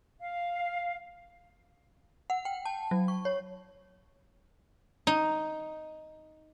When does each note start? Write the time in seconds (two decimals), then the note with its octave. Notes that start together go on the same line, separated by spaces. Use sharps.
0.20 F5
2.30 F#5
2.45 G5
2.65 A5
2.91 F#3
3.08 C#6
3.25 C#5
5.07 D#4